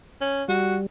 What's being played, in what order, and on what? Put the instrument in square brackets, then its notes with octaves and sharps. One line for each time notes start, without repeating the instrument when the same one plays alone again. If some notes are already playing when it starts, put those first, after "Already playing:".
[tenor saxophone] C#4
[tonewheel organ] G3 [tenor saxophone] F#4